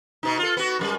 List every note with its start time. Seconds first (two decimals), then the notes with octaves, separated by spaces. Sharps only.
0.23 B2 D#4
0.39 F4 A4
0.57 B3 F#4
0.79 F#2 F3 G3